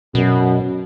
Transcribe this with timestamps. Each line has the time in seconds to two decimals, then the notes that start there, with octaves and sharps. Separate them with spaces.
0.15 F#2 B2